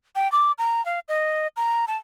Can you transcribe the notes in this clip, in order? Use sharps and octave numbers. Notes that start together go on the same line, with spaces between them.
G5
D6
A#5
F5
D#5
A#5
A5